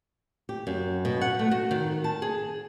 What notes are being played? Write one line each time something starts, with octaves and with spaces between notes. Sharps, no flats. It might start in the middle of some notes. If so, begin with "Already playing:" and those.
G4
F#2
B2
F#5
A3
F#4
D#3
A5
G#4